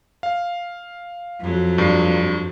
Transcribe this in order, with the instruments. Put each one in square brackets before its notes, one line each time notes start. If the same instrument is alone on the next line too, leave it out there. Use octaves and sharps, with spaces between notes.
[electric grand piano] F5
[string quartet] F2 F#3
[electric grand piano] G2 C7